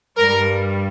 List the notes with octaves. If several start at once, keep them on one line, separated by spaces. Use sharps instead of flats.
G2 G3 A#4